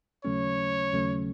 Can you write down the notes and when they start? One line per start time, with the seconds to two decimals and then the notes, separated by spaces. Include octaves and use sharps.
0.24 D#2 C#3 F#3 A3 C#4 C#5
0.93 D#2 C#3 F#3 A3 C#4